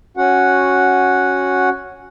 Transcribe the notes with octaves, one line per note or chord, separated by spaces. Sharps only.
C#4 F#4 F#5